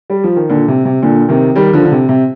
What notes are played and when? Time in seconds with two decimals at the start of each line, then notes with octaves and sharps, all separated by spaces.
0.10 G3
0.24 F3
0.36 D#3
0.49 A#2 D3
0.68 C3
0.85 C3
1.02 A#2 D3
1.29 C3 D#3
1.56 D#3 G3
1.73 D3 F3
1.85 D3
1.91 C3
2.09 C3